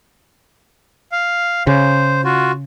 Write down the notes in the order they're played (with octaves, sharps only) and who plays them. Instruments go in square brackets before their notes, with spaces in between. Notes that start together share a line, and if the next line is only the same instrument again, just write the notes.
[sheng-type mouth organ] F5
[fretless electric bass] C#3 [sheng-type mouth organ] C5
[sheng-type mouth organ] F4 F#4